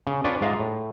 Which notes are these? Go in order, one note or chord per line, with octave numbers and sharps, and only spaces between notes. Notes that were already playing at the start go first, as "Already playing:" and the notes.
C#3
C4 D4 F4 B4 C#5 D5
G#2 G#3 F4 E5 F5 A#5
A2